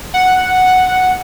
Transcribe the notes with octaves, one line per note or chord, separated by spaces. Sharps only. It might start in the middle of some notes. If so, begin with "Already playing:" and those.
F#5